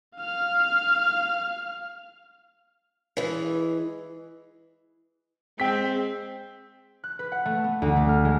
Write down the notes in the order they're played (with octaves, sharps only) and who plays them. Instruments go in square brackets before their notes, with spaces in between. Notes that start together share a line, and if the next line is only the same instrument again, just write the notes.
[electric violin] F5 F6
[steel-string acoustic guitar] E3 G#3
[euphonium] G#3 [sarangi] C4 [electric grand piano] G5 B6
[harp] F#6
B4
F#5
A3
B3
D2
A3
F6
G#3